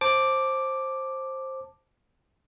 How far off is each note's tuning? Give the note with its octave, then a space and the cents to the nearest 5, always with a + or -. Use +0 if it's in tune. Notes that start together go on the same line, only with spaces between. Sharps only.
C5 +15 A5 +0 D6 +0